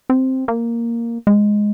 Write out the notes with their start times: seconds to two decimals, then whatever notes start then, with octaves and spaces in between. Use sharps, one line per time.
0.09 C4
0.48 A#3
1.27 G#3